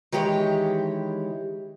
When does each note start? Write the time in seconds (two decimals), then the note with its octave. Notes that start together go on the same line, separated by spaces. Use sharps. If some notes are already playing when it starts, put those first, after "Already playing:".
0.12 D#3 E3 G#3 G4 C#5